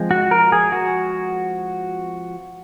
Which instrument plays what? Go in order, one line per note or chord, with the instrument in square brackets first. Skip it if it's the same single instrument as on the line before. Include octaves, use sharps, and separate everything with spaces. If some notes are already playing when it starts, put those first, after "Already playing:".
Already playing: [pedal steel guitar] F3 G#3 C4
F#4
A#4
G#4
F#4